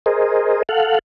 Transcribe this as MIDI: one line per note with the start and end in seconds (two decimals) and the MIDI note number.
0.06 0.63 68
0.06 0.63 70
0.06 0.63 72
0.06 0.63 75
0.69 0.99 69
0.69 0.99 77
0.69 0.99 78